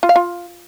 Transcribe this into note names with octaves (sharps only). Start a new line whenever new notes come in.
F4
F5
F4